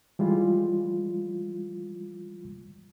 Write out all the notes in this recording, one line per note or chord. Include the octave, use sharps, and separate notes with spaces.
E3 G3 G#3 F4